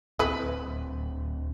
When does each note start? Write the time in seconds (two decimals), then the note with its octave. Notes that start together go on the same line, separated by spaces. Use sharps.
0.19 D1 C4 E4 B4